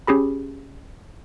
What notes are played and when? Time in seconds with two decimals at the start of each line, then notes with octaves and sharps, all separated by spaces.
0.07 C#4 G4 G#4 B5